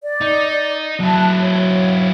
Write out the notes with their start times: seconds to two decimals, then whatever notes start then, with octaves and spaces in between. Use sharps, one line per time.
0.01 D5
0.21 D#4
1.00 F#3 E4 A5 F#6
1.39 C#5